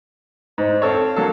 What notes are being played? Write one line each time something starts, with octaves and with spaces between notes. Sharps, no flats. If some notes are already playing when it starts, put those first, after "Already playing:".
G#2 C5
C4 A4 C#5 F5
F#3 A#3 A4